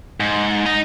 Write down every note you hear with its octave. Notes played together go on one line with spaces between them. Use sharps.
G#2
D#4